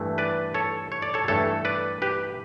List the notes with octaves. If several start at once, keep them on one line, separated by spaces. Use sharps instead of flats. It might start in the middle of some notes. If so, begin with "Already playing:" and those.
Already playing: G2 E3 A3
B4 D5
A4 C#5
C#5
D5
A4 C#5
G2 E3 A3 A4 C#5
B4 D5
G4 B4